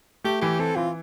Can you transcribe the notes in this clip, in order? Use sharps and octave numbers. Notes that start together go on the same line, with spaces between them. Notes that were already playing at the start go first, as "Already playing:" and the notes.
A3 G4
E3 G4
C4 A4
E3 F4